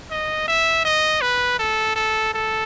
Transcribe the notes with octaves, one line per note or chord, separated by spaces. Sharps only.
D#5
E5
D#5
B4
A4
A4
A4